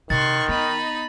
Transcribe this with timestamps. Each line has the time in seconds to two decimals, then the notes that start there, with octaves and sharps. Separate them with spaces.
0.10 C3 D#3 C6 C#6 F#6 A6
0.48 B3 D#4 D#5 B5